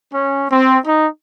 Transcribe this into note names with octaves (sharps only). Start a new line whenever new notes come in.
C#4
C4
D#4